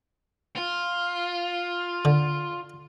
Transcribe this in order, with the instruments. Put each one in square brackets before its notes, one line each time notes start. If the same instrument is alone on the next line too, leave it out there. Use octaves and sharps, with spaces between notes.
[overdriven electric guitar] F4
[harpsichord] D3